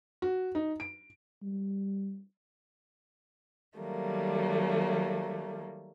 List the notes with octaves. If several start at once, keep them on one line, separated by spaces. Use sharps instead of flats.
F#4
D#4
D7
G3
D#3 F#3 G3 A3 A#3